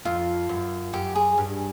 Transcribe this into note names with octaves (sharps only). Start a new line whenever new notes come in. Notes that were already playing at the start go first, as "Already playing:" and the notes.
F2 F4
F#2
F#2 G4
G#4
G2